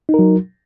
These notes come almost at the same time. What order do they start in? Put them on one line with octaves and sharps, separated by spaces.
D#4 A#4 F#3